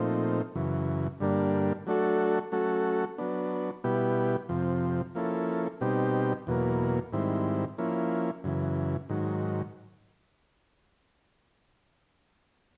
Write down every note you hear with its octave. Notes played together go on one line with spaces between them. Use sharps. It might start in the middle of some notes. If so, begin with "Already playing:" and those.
Already playing: A#2 F3 A3 C4 D#4
F#2 C#3 E3
G2 D3 G3 A#3 D4
F#3 A3 D4 F#4 A4
F#3 A3 C#4 F#4 A4
F#3 B3 D4
B2 G3 B3 E4 G4
F2 C3 F3
F3 A#3 C#4 E4 A4
B2 G3 C4 D#4 G4
E2 B2 F#3 A#3
G#2 D#3 G3 C4 E4
F3 A#3 C#4 E4
F#2 C#3 E3
G#2 D#3 F#3